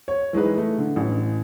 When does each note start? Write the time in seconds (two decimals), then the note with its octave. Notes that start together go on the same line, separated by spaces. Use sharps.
0.08 C#5
0.33 E3 G#3 D#4 B4
0.58 A3
0.78 D3
0.96 A1